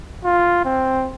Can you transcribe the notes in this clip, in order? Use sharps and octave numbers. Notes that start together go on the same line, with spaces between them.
F4
C4